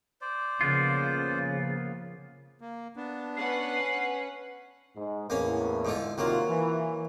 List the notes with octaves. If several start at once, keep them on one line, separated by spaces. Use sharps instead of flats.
C5 D5
C#3 F3 A#3 B3 F4
A#3
B3 D4 A5
C#4 B4 F#5 C7
G#2
E2 A2 A#3 C#4
G#2 D3 F4
C3 D#3 F#3 A#3 F4
E3